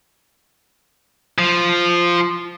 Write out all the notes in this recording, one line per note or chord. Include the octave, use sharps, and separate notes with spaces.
F3